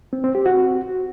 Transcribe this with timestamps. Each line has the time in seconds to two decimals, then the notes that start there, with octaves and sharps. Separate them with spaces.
0.13 C4
0.24 C4
0.35 G4
0.46 F#4